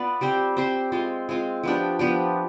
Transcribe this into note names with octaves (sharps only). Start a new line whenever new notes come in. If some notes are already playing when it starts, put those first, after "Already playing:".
Already playing: B3 F4 B4 D5
G3 C4 G4 C5
G3 C4 G4 C5
G#3 C4 F4
G#3 C4 F4
F3 B3 D4 G4
F3 B3 D4 G4